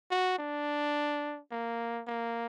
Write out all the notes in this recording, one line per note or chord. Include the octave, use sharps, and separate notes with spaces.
F#4
D4
A#3
A#3